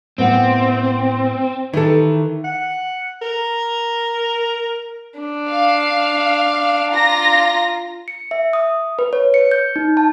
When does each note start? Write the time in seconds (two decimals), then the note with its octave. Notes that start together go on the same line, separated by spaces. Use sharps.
0.18 A2 B3 C4 F#5
1.74 D#3 E3 D#4 A4
2.45 F#5
3.22 A#4
5.20 D4
5.48 F5
6.93 F4 A#5 A#6
8.08 C#7
8.31 E5
8.53 D#6
8.99 B4
9.13 C#5
9.34 C#7
9.51 G6
9.76 D#4
9.97 A5